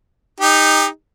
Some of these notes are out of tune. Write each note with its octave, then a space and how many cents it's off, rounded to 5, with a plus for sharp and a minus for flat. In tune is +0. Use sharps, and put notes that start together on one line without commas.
D#4 +0 G4 +30